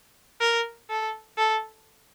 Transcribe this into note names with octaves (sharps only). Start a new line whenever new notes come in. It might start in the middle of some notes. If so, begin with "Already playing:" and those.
A#4
A4
A4